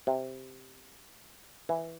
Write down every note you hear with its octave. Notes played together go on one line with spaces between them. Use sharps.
C3
E3